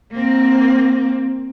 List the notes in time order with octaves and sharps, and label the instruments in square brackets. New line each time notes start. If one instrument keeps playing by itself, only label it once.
[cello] A#3 C4